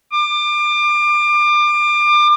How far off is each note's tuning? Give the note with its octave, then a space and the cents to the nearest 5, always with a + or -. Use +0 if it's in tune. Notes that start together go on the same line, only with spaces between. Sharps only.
D6 +30